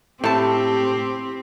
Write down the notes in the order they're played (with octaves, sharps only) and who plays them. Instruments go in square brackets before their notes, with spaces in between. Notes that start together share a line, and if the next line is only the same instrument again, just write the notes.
[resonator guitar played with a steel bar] A2 A5 [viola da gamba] C4 [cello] G4